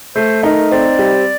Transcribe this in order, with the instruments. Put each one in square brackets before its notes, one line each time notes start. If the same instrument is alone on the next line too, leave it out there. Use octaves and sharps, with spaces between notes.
[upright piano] A3 [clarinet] C5
[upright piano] D#4 [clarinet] A#4
[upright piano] C4 [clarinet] D5
[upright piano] G3